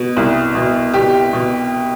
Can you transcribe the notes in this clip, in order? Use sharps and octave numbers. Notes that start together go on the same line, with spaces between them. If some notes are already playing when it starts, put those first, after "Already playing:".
Already playing: B2
C2
B2
B2 G4
B2